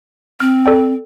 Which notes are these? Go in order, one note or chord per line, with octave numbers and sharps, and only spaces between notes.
C4 F6
A4 D5 G5